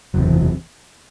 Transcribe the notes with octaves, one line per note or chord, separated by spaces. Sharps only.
F#1 E2 C3 F#3
E3
F#3